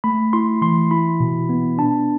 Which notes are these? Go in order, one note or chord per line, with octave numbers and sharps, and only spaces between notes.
A3 B5
E4 C6
E3 C6
E4 B5
B2
B3
D4 A5